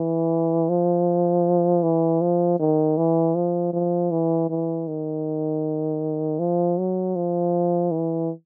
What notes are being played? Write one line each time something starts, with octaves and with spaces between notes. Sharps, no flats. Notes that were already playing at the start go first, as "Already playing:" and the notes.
Already playing: E3
F3
E3
F3
D#3
E3
F3
F3
E3
E3
D#3
F3
F#3
F3
E3